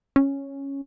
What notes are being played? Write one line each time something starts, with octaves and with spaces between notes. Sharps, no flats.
C#4